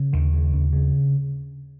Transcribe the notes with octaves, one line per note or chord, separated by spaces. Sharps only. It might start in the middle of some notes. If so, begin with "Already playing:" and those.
Already playing: C#3
D#2 D#3
C#3
D#2
C#3